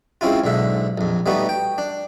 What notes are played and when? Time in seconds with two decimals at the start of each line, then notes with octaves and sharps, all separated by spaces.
0.21 G#3 C4 C#4 E4 F4
0.44 B1 G#2 D3 E5
0.98 A#1 F2
1.26 G3 A3 B3 D#4 F#4
1.49 G5
1.78 D4